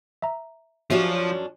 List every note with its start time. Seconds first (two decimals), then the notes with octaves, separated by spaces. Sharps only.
0.22 E5 A#5
0.90 F#2 F3 C#4 D4 F#4 G4 E5